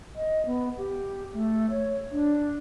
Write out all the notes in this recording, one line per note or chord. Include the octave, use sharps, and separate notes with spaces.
D#5
B3
G4
A3
C#5
D4